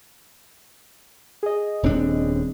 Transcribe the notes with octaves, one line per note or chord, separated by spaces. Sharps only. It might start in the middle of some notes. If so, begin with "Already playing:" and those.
G#4 D#5
D#1 C4 D4